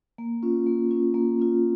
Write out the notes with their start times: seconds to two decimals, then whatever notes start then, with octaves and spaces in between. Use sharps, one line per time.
0.18 A#3
0.43 C#4 F4
0.67 A#3
0.91 C#4 F4
1.14 A#3
1.39 C#4 F4